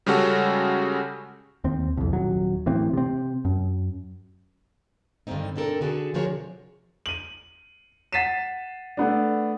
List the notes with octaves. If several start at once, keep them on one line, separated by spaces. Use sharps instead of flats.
C#3 G3 G#3 C#4 F#4 A4
D#2 C4
C2 F2
D#1 F#3
A1 E3 C4
C3 C4
F#2
G2 D3 D#3 G3 C4 D#4
A#3 C4 D4 A4 A#4
D3 F#4 G#4 A4
D3 F3 F#4 G#4 A#4 C#5
C3
D#7 F#7
F#5 A6 B6 C7 D#7 E7
A3 B3 D4